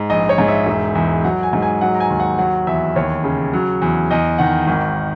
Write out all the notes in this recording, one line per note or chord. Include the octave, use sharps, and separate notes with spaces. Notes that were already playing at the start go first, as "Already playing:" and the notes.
Already playing: G#2
A#1 D#5
C#5
G#2
E5
E1
E2
F#3 F#5
G#5
G#2
G#5
F#3 F#5
A#5
G#5
D#2
F#5
F#3 F#5
E2 E5
D#2 C#5
C#3
F#3
E2
E2 D#5
D#3 F#5
G#1